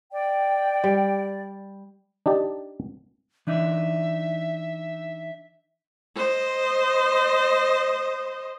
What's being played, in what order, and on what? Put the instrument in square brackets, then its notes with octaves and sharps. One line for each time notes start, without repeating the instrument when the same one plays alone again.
[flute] D5 [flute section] G5
[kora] G3
[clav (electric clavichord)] D4 D#4 G4 D5
[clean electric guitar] E3 D4 D#4 [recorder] E5
[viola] C5 D#5